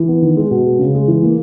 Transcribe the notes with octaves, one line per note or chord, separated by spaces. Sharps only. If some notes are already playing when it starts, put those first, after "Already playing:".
Already playing: E3
B3
D#3
G#3
B2
G#3
C#3
G#3
E3
A#3